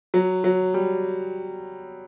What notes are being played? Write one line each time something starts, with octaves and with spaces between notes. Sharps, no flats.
F#3
F#3
G3